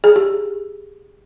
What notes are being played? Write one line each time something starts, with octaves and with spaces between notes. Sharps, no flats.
G#4
G4